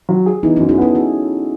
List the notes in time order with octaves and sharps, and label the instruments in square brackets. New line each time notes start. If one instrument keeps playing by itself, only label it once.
[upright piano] F#3
G#4
[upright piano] E3 [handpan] B3 D#4
[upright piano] F#2 [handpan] C#4 E4
[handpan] E4 G#4
[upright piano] B3 [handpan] F#4 A4
[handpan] E4 G#4